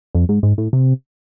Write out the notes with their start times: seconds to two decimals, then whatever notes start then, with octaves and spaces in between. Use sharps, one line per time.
0.15 F2
0.29 G#2
0.43 G#2
0.58 A2
0.73 C3